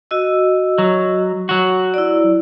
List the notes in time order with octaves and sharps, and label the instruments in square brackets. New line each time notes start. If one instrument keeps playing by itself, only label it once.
[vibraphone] F#4 D#5 E6
[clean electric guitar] F#3
F#3 F#4
[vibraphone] E4 D5